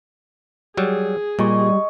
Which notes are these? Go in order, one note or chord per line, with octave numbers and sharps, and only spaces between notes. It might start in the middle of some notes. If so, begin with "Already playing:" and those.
F#3 G3 G#4
A#2 G3 D#5 G#5 C#6